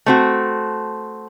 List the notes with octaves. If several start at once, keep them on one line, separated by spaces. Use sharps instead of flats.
A3 C4 F#4